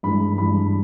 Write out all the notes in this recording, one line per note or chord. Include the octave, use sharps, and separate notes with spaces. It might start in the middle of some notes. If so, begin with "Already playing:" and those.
G2 E3 G#3 B5
G2 E3 G#3 B5